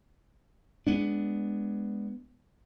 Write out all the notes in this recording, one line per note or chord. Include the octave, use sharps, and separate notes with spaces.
G#3 B3 D4